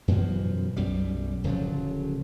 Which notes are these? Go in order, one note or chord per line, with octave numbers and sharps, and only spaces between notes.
F#2 B2 E3 F3
B1 F#2 G3
D1 C#3 F3 F#3